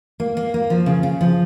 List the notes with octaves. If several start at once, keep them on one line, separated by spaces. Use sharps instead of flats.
A#3
A#3
A#3
F3
C#3
C#3
F3